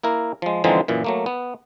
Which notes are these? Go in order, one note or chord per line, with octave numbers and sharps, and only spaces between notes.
A#3 E4 A#4
F3 G#3
D3 E3 F3 G#3 C4 D#4
F#2 A#2 E3
F#3 A3 A#3
B3